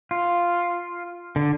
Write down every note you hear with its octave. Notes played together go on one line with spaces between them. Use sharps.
F4
D3